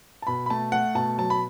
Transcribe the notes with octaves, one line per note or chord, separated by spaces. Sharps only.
A5
B2 B5
B5
A3 A5
A3 F#5
B2 A5
F#3 A5
B5